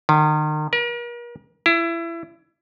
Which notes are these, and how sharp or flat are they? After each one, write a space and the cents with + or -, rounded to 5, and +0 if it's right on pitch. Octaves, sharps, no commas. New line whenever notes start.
D#3 -35
A#4 +40
E4 +25